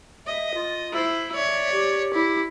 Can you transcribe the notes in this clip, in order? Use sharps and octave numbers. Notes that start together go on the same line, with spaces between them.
D#5 E5
F4
E4 C5
C#5 D5 E5
G4
E4